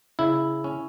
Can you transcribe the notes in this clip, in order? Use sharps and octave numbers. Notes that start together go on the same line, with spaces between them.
C#3 E4
C#4